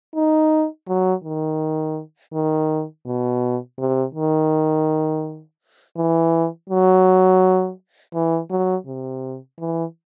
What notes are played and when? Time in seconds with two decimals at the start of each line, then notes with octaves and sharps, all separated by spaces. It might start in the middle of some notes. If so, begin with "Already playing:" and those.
0.15 D#4
0.88 F#3
1.24 D#3
2.33 D#3
3.06 B2
3.79 C3
4.14 D#3
5.97 E3
6.69 F#3
8.14 E3
8.50 F#3
8.87 C3
9.59 E3